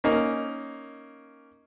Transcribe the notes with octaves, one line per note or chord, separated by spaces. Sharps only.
A#3 C#4 D#4